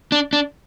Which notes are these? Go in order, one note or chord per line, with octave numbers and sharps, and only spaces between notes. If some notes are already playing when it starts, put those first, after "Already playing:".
D4
D4